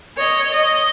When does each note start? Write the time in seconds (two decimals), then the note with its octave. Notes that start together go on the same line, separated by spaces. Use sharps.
0.17 C#5 D#5
0.51 D#5